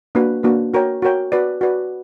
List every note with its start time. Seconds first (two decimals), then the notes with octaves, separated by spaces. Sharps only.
0.15 A#3 D4 F#4 B4
0.43 A#3 D4 F#4 B4
0.74 F#4 A#4 C#5 G5
1.02 F#4 A#4 C#5 G5
1.32 F#4 B4 D5
1.61 F#4 B4 D5